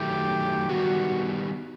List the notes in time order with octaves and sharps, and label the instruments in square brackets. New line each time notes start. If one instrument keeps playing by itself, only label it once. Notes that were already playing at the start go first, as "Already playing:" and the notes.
Already playing: [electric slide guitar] D#3 F#3 A3 [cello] G4
[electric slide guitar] D#3 G3 B3 [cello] F#4